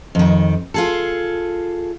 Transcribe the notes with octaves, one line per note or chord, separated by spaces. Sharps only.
F2 D#3
F4 G#4 A4